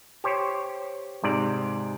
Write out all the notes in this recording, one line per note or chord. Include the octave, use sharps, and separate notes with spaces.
G4 C5 C#5
G#2 C3 D5